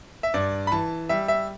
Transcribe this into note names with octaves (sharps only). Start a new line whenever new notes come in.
E5
G2 D5
B5
E3 A5
G3 E5
E5